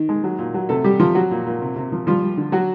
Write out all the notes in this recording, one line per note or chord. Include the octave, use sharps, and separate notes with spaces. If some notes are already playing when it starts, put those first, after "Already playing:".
Already playing: D#3
G#3
F#3
A#2
F#3
C3 A3 A4
G3 G4
C3 F3 F4
F#3 F#4
A#2
A#2
C3
C3
F3
F3 G3 F4
G3
D3
F#3 F#4